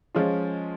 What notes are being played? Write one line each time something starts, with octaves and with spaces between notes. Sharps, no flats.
F3 G#3 C#4 F4